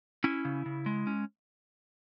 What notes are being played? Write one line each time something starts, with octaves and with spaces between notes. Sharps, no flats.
C#4 E4
C#3
C#3
G#3
C#4